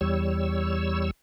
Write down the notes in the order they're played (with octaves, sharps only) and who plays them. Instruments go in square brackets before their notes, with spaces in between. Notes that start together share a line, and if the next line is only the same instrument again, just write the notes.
[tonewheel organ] E2 G3 C#5 E6